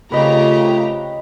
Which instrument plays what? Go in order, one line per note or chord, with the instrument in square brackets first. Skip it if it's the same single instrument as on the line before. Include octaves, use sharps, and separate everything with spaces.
[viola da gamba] C#3 [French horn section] A3 F4 [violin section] C4 G4 A#5 [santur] B4 D#5